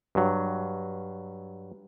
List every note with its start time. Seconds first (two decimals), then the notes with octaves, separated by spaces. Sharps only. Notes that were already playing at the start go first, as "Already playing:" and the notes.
0.15 G2 F#3